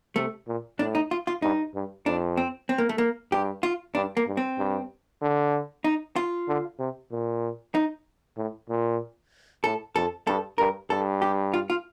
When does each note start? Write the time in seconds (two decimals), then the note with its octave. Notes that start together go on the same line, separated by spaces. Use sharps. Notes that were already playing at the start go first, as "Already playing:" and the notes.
0.16 C3 A3
0.47 A#2
0.79 A2 D4
0.95 D#4
1.11 F4
1.27 F4
1.42 G2 D#4
1.74 G2
2.06 F2 D4
2.37 C4
2.69 C4
2.78 A#3
2.89 A3
2.98 A#3
3.31 G2 G4
3.63 F4
3.95 G2 D4
4.17 A#3
4.27 G2
4.37 C4
4.58 G2
5.22 D3
5.84 D#4
6.16 F4
6.48 D3
6.79 C3
7.11 A#2
7.75 D#4
8.37 A2
8.69 A#2
9.64 A2 A4
9.95 F2 A4
10.27 G2 A4
10.58 G2 A#4
10.90 G2 A4
11.22 G4
11.54 F4
11.70 F4